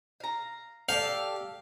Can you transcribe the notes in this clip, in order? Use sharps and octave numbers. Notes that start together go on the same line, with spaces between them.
F5 A#5
G4 A4 D5 F5